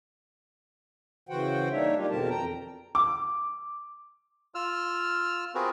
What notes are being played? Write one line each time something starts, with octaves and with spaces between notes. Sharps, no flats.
C#3 E3 F#4 C5 F#5 G5
G3 A#3 D4 D#4 C#5 E5
G3 A#3 D#4 F4 G4
E2 B2 D3 C4 A#4 A5
F2 G5 A#5
D6
F4 E6 F6
C4 F4 F#4 G#4 A#4 B4